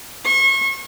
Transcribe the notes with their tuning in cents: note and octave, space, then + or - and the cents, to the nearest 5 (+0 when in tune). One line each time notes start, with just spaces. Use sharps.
C#6 -35